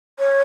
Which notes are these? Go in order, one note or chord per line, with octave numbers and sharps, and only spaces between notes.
C#5